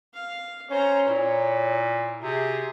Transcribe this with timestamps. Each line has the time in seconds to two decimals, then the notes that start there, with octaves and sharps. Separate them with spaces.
0.14 F5
0.70 C#4 C5 C#5 A#5
1.08 A#2 E4
2.22 C3 F#4 G#4